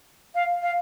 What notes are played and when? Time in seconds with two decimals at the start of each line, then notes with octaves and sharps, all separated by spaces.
0.35 F5
0.62 F5